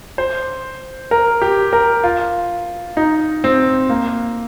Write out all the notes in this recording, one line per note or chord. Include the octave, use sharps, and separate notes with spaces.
C5
A#4
G4
A#4
F4
D#4
C4
A#3